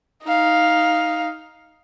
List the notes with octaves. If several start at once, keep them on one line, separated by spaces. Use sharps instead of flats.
D#4 F5